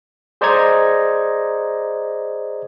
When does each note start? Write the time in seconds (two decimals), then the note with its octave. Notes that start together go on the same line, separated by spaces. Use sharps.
0.41 G#4 C5 D5 D#5 A#5 G#6